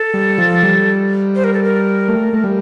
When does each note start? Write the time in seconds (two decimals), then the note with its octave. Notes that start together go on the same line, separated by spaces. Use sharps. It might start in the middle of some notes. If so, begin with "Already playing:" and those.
Already playing: A4
0.14 G3
0.38 F3
0.63 G3
1.35 C5
1.44 A#4
1.54 A4
1.64 A#4
2.08 A3
2.33 A3
2.44 G3